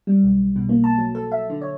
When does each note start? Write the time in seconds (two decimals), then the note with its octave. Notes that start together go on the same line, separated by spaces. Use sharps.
0.07 G3
0.23 B1
0.56 B2
0.69 A#3
0.84 A5
0.98 F#3
1.15 A4
1.32 E5
1.50 D3
1.61 C#5